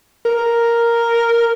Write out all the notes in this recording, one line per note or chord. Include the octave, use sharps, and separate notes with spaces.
A#4